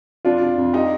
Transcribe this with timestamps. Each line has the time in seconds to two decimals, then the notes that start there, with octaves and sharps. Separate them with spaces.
0.25 F2 D4 F4
0.41 C3
0.58 F2
0.73 D#4 G4